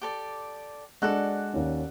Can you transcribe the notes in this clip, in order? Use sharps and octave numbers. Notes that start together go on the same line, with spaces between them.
G4 A4 D5
G#3 D4 F#4 A4 D5 F#6
D#2 C#4